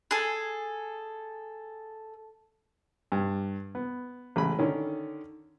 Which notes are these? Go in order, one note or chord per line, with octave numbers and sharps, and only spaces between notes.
G#4 A4
G2
B3
A1 C#3 G#3 B5
D3 D#3 C#4